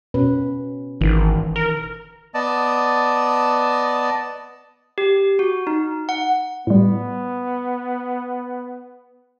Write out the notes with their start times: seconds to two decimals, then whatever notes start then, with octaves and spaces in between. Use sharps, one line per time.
0.14 B2 C#4 B4
1.01 G#1 D#3 E3
1.56 A#4
2.34 B3 D5 D#5 A5
4.98 G4
5.39 F#4
5.67 D#4
6.09 F#5
6.67 A2 G3 B3